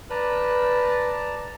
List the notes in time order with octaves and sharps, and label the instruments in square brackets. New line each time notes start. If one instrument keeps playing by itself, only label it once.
[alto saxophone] B4 [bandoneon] D5 A5 A#5